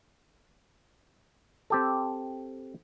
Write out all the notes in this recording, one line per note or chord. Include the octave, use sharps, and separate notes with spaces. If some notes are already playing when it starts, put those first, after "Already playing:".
C4 G4 A4